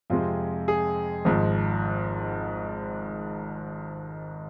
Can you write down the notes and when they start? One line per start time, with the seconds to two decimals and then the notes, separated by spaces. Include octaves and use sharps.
0.10 F2 C3 G#3 F4
0.68 G#4
1.25 G#1 G#2 F3